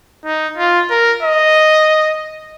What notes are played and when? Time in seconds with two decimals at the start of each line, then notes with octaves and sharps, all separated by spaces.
0.25 D#4
0.57 F4
0.90 A#4
1.23 D#5